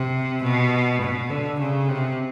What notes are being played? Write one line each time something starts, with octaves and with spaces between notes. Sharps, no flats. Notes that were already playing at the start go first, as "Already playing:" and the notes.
Already playing: C3
B2
B2
D3
C#3
C3